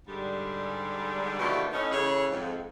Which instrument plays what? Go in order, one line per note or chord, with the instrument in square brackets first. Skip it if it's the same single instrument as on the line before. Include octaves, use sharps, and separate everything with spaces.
[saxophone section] G#2 D3 G3
D#2 B2 D3 F3 A3 G4
A2 C#4 D#4
C#3 E3 A3 G#4 C#5
F2 G#2